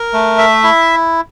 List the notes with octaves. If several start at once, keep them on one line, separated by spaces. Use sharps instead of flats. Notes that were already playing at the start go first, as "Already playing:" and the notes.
Already playing: A#4
A3
E5
E4